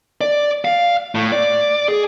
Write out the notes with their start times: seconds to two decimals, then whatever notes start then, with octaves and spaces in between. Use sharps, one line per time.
0.21 D5
0.65 F5
1.15 A2
1.32 D5
1.89 G#4